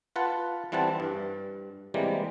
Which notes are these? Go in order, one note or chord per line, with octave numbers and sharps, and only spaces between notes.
F4 B4 F#5 A5
E3 G3 C4 F#5 A5
G2
C3 E3 G3 G#3 A#3